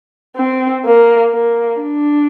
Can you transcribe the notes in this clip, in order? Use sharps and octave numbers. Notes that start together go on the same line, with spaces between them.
C4
A#3
A#3
D4